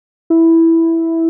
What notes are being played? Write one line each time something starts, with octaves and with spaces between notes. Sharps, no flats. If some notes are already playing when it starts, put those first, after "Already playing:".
E4